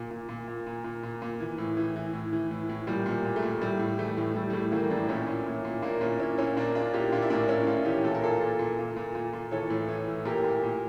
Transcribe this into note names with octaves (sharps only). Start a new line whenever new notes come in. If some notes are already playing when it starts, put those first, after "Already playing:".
Already playing: A#2
A#2
A#2
A#2
A#2
A#2
A#2
A#2
E3
A2
E3
E3
A2
E3
A2
A2
A#2 G3
A#2
G3
A#2
A3
A#2
A2 G3
A2
E3 A3
A2
A2 G3
G3
A2 A3
E3 G3 A#3
A2 A#3 D4
A#2 C#4 E4
A#2
A#2
A#2
A#2 A#3 D4
A#2 C#4 E4
A#2 C#4 E4
A#2 C#4 E4
A#2 A#3 D4
A#2 D4 F4
A#2 E4 G4
A#2 D4 F4
E4
A2 A#3 D4
A2 C#4 E4
A2 D4 F4
E3 E4 G4
A#2 A4
A#4
A#2 F4 A4
A#2
A#2
A#2
A#2
A#2
A#2
E3 A4 C#5
A2
E3
A2
A#2 G4 A#4
A#2
A#2